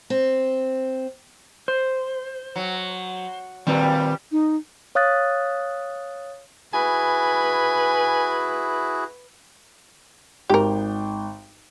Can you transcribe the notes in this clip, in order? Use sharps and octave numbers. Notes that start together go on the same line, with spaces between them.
C4
C5
F#3
A#2 D#3 G3 C4 B4
D#4
C#5 F5 D#6 F#6 A6
E4 F#4 G#4 B4 G#5
G#1 G4 A#4 G5